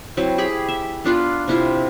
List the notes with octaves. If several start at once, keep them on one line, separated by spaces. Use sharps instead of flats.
F#3 C4 E4
G4 G#4 B5
E5
B3 D4 F4 B4
C3 E4 F4